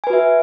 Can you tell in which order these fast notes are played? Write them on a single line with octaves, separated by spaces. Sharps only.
G#5 B4 F#4 E5